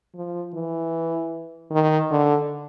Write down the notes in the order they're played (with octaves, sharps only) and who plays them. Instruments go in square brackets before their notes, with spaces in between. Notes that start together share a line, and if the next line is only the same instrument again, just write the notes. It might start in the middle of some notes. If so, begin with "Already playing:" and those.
[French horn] F3
E3
D#3
D3